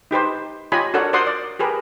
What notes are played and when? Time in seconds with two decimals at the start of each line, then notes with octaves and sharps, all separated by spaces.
0.11 D#4 G4 B4 C5
0.72 F4 G4 C#5 D#5 G#5 B5
0.94 D4 F#4 A4 A#4 C#5 F#5
1.13 A#4 C5 D5 F#5 C6 D#6
1.27 D5
1.59 G4 G#4 A#4 B4